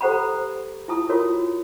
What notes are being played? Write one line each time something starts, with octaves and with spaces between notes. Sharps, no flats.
G4 A4 C5 F#5 A#5 B5
E4 F4 A5 D#6
F4 F#4 A#4 C#5